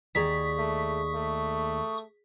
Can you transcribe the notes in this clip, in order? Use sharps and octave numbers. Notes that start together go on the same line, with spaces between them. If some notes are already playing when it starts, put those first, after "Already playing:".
D#2 G#4 D5 A#5 C#6 D#6 B6
A3
A3